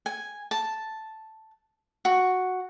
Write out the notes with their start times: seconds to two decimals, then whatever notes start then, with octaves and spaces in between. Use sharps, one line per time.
0.06 G#5
0.51 A5
2.05 F#4